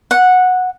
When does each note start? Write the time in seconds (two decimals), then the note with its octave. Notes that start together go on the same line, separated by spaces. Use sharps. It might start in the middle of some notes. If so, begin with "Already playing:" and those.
0.11 F#5